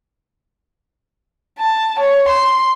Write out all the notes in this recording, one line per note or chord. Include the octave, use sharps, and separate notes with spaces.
A5
C#5
C6